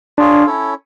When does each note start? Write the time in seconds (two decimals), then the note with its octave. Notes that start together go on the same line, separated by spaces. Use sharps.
0.18 D4 F4 G#4 C#5 F5
0.46 C#4 E4 A4 C#5